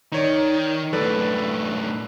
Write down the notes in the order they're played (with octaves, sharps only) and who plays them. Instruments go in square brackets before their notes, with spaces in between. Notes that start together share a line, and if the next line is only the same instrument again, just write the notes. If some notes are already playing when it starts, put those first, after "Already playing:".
[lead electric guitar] D#3 [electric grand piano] D#4 C#5 D5
[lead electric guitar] F#2 A2 [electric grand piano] A4 B4 D5